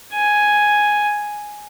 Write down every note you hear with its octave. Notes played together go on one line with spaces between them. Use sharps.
G#5